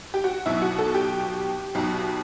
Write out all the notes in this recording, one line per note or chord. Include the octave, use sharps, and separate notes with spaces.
G4
F#4
B1 B2 F#3 E4
F#4
A4
G4
B1 B2 F#3